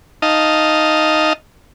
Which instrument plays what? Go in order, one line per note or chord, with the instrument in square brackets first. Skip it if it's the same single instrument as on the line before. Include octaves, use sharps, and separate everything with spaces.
[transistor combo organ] D#4 D#5 F5 A5